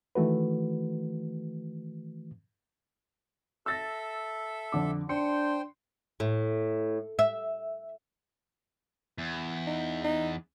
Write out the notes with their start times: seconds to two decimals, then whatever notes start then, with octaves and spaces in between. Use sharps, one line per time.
0.15 D#3 E3 A3 F#4 B4
3.66 A4 E5 E6 A6 A#6
4.72 F2 D3 D6
5.09 D4 C5 G5 C6 C#7
6.20 A2
7.19 E5
9.18 E2
9.66 D#4
10.04 D#4